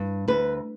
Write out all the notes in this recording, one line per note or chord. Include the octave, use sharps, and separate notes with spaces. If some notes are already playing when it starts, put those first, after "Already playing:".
Already playing: G2
D2 B4